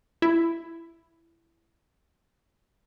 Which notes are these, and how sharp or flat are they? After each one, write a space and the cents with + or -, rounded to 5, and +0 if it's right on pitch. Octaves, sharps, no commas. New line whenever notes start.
E4 +15